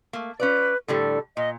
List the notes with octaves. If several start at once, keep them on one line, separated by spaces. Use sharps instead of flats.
A3 A#3
C#4 F4 B4 D5
A2 D3 G3 A4
A#2 D#5